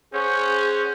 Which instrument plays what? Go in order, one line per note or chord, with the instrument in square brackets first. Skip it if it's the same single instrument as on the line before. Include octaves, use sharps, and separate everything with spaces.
[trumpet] C#4 [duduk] G#4 [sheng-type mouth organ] C5 C#5 F#5 [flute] G6